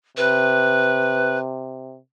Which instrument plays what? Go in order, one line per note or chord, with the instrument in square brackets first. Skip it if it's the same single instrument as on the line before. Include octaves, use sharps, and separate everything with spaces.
[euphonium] C3 [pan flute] B4